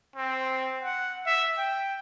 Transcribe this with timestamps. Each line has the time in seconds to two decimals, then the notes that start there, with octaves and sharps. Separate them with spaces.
0.16 C4
0.83 F#5
1.26 E5
1.58 G5